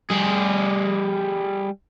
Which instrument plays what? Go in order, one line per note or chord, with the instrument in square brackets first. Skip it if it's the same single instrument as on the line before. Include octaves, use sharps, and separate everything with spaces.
[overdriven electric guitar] G3 G#4